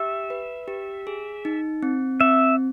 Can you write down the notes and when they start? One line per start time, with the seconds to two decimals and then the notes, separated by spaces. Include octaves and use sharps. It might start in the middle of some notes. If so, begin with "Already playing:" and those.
Already playing: G4 E5
0.30 B4
0.68 G4
1.07 G#4
1.45 D#4
1.83 C4
2.20 C4 E5